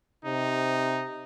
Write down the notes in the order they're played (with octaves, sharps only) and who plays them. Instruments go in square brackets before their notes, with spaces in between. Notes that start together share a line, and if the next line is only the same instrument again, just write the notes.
[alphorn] C3 [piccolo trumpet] D#4